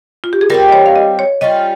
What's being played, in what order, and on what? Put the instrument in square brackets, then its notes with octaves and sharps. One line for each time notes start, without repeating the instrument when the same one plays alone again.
[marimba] F4
G4
G#4
[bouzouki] G3 C4 G4 [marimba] A#4
[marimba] D#5
C#5
F5
D#5
C#5
[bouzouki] G3 C#4 F4 [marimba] D#5